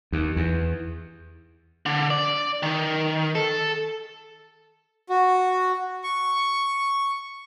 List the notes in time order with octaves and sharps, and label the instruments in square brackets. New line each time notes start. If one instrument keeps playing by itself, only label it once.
[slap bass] D#2
E2
[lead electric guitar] D3
D5
D#3
A4
[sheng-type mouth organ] F#4
C#6